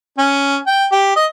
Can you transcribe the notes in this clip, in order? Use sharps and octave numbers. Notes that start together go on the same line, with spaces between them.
C#4
G5
G4
D#5